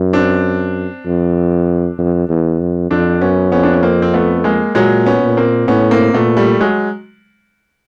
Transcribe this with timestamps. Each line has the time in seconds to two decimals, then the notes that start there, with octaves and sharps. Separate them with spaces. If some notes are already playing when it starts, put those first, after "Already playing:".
Already playing: F#2
0.13 C4 D4
1.06 F2
1.98 F2
2.29 E2
2.60 F2
2.91 F2 C4 D4
3.21 F#2 B3 C#4
3.52 F2 B3 C#4
3.63 D4
3.73 C#4
3.83 A#3 C4
4.02 C4
4.14 A3 B3
4.44 G#3 A#3
4.75 A#2 F#3 G#3
5.06 B3 C#4
5.22 A#2
5.37 A#3 C4
5.68 A2 B3 C#4
5.91 A#3 C4
6.13 A#2 A3 B3
6.37 G3 A3
6.61 F#3 G#3